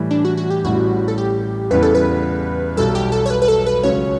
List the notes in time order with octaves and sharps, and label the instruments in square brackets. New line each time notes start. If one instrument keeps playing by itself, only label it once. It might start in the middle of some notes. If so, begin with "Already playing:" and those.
Already playing: [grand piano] A2 E3 G3
[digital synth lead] D4
F#4
F#4
G4
[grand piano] A1 A2 G3 [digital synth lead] F#4
[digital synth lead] A4
G4
[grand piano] E2 C#3 E3 G3 B3 [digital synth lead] B4
[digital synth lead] A4
B4
[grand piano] B1 B2 G3 [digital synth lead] A4
[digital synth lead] G4
A4
C#5
B4
B4
A4
B4
[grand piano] C#2 C#3 F#3 C#4 [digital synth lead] C#5